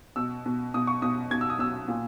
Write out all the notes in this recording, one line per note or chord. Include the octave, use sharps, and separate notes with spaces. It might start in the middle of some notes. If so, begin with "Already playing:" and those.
B2 E6
B2
B2 D#6
C#6
B2 D#6
B2 G#6
E6
D#6
B2 E6
A#2